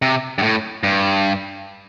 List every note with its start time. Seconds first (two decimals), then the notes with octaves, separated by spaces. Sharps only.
0.02 C3
0.38 G2
0.43 A2
0.83 G2